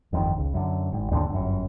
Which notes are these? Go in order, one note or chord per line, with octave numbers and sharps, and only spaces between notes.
G1 F2 D3 D#3
C#2
F#2 D3
G#1
D#2 G#2 D3 D4
G1 F#2